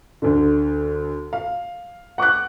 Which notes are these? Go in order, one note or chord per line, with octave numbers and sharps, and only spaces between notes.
D2 D3
F5
F#5 C#6 D6 F#6